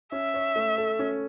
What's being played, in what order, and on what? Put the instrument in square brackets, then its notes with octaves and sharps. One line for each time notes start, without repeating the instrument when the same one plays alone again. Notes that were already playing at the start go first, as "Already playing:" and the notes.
[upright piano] C#4 [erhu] E5
[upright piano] C#5
A3
A4
C#4